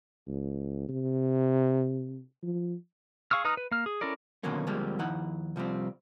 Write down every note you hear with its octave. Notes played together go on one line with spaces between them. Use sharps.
C#2
C3
F3
G#4 F5 C#6 E6 F6
D#4 B4 A#5 D#6 F6
B4
A#3 F6
G#4
C#4 E4 A4 A#4 D5
B2 D3 D#3 F#3 A#3 C#4
D2 F3 G3 G#3 A#3 C4
D#2 F3 D#4 E4 F#5
C2 F3 G3 C4